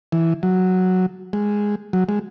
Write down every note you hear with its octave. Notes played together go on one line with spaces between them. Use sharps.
E3
F#3
G#3
F#3
G#3